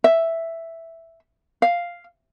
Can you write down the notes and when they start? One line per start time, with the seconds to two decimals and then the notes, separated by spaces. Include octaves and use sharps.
0.04 E5
1.62 F5